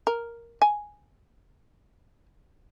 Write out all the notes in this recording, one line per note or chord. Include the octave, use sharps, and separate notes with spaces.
A#4
G#5